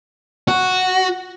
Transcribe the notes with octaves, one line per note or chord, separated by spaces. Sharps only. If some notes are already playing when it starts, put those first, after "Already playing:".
F#4